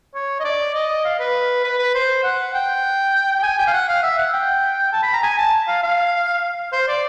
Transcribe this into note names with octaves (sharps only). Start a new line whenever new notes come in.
C#5
D#5
D5
D#5
F5
B4
B4
B4
C5
F#5
G5
G5
G#5
G5
F5
F#5
F5
E5
F#5
G5
A5
B5
A#5
G#5
A5
F5
F5
C5
D5